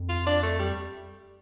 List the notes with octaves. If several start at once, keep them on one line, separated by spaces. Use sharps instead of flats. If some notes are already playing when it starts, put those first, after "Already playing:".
Already playing: F2
F4
D4
A3
G3